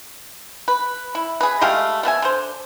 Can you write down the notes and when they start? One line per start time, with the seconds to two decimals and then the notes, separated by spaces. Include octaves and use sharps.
0.68 B4
1.15 E4
1.41 G#4 B4
1.61 G#3 A3 G4 F5
2.03 A3 B3 E5 G#5
2.22 D3 C5